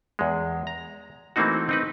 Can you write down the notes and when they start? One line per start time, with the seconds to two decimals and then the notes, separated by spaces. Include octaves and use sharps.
0.19 E2 G#3
0.67 A#5
1.36 E3 A3 A#3 C4 D#4 F#4
1.69 C4 D#4 B4